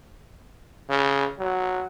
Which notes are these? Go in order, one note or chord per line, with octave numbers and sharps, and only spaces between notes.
C#3
F#3